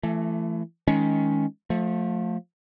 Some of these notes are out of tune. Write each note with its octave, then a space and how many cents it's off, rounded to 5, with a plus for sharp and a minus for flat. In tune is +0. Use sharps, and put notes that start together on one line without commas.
E3 +30 A3 +0
D#3 +25 G#3 +15 C#4 +15
F3 +25 A3 +0